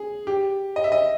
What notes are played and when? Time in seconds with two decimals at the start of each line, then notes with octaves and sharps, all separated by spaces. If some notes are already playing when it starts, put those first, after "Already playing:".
Already playing: G#4
0.27 G4
0.76 D#5
0.84 E5
0.92 D#5